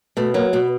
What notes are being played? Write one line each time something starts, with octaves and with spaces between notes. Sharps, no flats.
B2 A3
F#3 A#3
B2 B3